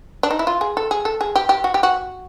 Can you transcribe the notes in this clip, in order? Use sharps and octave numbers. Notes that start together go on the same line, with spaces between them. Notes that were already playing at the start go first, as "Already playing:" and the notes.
D4
D#4
E4
F4
G#4
A4
G#4
A4
G#4
G4
G4
F#4
G4
F#4